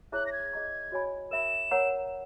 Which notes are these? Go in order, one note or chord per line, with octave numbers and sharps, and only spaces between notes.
E4 G#4 C#5 E5 A#5 F#6
A#6
G#6
G#4 D#5 A#5 C#6
F#4 C#5 G#5 B5
A#4 E5 B5 E7
A#4 C#5 F#5 A#5